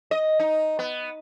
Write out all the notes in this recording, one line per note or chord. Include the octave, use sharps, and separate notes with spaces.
D#5
D#4
B3